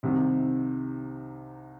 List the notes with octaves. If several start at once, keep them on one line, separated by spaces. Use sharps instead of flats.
C2 C3 D#3